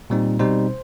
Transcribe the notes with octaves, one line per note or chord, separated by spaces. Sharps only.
A#2 G3 C4 D#4
B2 G3 C4 D#4 C5